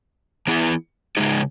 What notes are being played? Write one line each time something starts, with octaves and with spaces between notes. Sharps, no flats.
E3 B3 E4 G#4
C#3 G#3 D#4 G#4